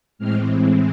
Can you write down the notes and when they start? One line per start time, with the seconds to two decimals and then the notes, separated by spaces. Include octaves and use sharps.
0.19 A2 E3 G#3 C4 F6